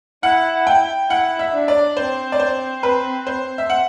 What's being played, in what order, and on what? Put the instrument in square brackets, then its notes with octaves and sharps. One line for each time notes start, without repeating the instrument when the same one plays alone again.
[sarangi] E4 [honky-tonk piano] F#5
[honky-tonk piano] G5
[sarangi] E4 [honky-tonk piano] F#5
[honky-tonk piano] E5
[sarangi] D4
[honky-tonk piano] D5
[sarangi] C4 [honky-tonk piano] C5
[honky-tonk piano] D5
C5
B4
C5
E5
F#5